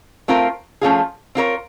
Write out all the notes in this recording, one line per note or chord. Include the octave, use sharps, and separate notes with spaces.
A3 C4 F4 A#4
F3 A3 C#4 F4 G#4
C4 F4 A#4 C#5